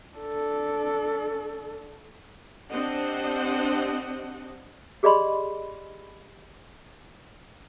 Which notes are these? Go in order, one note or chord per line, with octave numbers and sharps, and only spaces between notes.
D4 A4
C4 D4 G4 C5 D#5 F#5
G4 G#4 D5 D#5 B5 C6